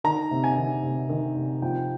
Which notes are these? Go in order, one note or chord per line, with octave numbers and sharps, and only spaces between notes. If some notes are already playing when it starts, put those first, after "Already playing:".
D#3 A#5
C3
G#5
D#3
C3
D#3
C3
F3 G5